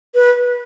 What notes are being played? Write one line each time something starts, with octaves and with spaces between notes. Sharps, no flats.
B4